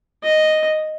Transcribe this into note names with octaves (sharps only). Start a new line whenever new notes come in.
D#5